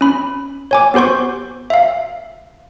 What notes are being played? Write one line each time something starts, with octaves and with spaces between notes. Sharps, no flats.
C#4 B5
C#5 G#5 D6
B3 G4 C5 C6 C#6
E5 F5